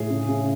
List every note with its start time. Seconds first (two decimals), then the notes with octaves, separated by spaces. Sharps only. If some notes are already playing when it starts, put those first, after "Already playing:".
Already playing: A2 G#4
0.10 C#3
0.29 C#3